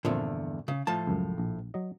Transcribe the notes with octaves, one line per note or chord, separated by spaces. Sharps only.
E2 G2 A#2 D3 F3 C4
C#3
A2 F3 A5
C#2 F#2
A#1
F#3 D#5